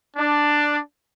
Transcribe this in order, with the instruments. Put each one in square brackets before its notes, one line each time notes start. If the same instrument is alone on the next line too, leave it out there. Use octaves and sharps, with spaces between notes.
[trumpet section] D4